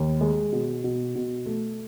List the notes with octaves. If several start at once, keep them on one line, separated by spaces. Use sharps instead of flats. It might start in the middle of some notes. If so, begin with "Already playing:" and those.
Already playing: D#2
G#3
B2
B2
B2
A3